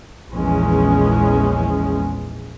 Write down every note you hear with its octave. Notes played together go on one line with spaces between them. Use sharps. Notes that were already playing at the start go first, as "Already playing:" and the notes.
A#1 E2 G#3 C#4